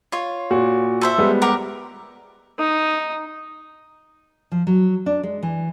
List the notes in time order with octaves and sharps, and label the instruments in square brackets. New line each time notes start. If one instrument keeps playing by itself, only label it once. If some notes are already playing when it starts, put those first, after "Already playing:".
[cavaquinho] F4 C#5
[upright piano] A#2 F#4
[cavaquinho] A4 C5 E5
[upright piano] G3 G#3 B3
[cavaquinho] G4 A#4 F#5
[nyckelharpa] D#4
[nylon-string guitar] F3
F#3
D4
G#3
E3